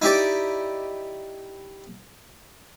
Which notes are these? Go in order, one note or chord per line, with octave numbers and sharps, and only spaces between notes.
D#4 E4 G4 D5